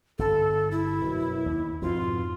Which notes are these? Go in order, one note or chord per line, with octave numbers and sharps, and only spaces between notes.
G1 A4
E4
F#2 B2
D#2
F2 G#2 B2 F4